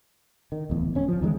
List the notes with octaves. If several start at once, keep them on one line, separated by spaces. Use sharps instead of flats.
D#3
D1 E2
D1 C#4
F3
E2 D#3 F#3 G#3